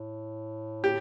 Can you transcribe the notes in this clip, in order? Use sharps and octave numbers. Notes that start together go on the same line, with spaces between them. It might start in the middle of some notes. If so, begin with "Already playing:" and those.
Already playing: A2
G4